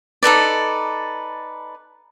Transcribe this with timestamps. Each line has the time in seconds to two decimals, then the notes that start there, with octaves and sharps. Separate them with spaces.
0.23 D#4 A4 B4 D5